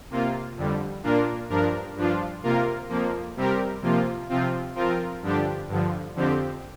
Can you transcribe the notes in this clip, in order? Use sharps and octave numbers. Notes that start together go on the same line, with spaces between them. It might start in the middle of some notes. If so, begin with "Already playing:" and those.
C3 A#3 F4
F2 D3 G3
A#2 A#3 D4 F4 A#4
G2 F3 D4 A#4
G2 F3 D4 F4
C3 A#3 F4 A#4
F2 F3 A#3
C3 G3 C4 G4 A#4
C3 F3 A#3 F4
C3 F3 C4 F4
F3 C4 F4 A#4
G2 D3 F3 D4 G4
G2 D3 F3
F2 D3 F3 C4 G4